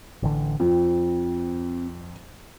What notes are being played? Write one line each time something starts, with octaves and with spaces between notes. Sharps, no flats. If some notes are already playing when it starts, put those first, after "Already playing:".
A1 D3
F2 C4